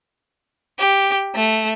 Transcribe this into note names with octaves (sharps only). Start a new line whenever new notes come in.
G4
A3